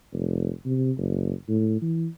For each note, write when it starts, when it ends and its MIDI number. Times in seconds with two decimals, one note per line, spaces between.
0.13 0.50 29
0.66 0.91 48
0.97 1.33 30
1.49 1.80 45
1.82 2.07 52